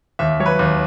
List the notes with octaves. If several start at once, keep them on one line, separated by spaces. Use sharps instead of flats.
D#2 E5
F#3 C#5
B4
D#2